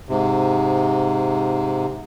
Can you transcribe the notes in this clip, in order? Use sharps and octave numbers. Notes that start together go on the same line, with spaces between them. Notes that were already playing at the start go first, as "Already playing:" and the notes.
G#2 C3